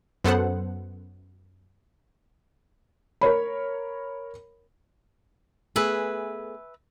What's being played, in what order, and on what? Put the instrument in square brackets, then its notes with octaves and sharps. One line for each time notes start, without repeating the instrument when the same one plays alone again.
[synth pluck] F#2 B3 A4 C5 F#5
[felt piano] A#4 C#5 B5
[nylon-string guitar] A3 B3 G#4 [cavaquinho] B4 E5 G#5